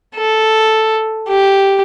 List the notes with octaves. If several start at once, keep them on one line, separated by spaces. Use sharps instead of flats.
A4
G4